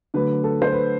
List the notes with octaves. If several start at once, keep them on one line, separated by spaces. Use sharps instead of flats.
D3 F#3 A3 B4
A4
C5
B4